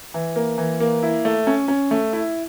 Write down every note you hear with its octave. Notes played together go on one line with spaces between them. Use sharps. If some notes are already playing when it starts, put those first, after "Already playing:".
E3
A#3
E3
A#3
E4
A3
C#4
C#4
A3
E4